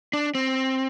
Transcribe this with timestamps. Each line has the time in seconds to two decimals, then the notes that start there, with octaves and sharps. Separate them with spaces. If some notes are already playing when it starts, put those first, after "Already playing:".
0.13 D4
0.35 C4